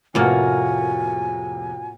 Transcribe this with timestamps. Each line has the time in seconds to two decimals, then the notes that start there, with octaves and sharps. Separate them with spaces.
0.15 F1 A2 C3 A#3 F4 F#4 G#5 F6